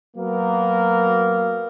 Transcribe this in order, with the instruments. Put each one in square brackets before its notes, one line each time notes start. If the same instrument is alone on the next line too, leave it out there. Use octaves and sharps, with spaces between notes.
[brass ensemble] F#3 A#3 B3 A#4